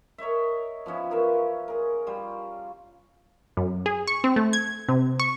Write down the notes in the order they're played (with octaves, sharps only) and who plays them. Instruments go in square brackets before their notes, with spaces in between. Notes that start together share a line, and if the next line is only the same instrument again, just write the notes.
[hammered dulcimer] A#4 C#5 D#5 E5
F3 B3 C#4 E4
F4 A#4 B4 E5
G#4 A#4
G3 F4
[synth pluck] F#2
G#4
C#6
C4
A3
G#6
C3
C#6